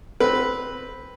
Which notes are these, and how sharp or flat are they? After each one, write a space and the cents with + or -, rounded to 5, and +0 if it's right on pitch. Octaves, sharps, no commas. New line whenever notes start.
C4 +0 B4 +0